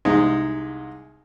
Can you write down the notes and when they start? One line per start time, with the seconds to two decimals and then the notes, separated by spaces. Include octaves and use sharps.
0.05 C2 G#3 D#4